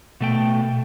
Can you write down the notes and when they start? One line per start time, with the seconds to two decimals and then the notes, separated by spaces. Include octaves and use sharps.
0.20 B2 A3 G5